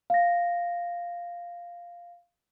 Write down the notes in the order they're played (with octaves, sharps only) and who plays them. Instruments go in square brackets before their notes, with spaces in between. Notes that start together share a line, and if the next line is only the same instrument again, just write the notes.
[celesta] F5 A#6